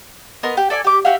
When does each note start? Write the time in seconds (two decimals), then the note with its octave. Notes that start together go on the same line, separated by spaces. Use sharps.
0.43 B3 A#4 D#5 C6
0.57 G4
0.70 A4 D5 E5 G#5
0.84 G4 D6
1.05 F#4 G4 E5 F5